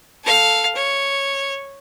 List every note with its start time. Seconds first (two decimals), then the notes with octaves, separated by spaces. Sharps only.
0.24 A4 F5
0.75 C#5